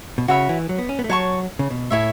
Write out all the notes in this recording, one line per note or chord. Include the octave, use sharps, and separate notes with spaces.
B2
C#3 F#4 C#5 E5 B5
E3
F#3
B3
C#4
B3
A3
F#3 C#5 A5 C#6
C#3
B2
A2 E4 A4 C#5 E5